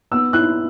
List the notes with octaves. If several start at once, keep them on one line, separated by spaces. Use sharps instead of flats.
B3 E6
E4 F#6